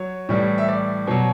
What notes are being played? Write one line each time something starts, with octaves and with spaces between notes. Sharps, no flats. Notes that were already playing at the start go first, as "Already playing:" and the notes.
Already playing: F#3 C#5
A2 E3 G3
E5
D5
B2 F#3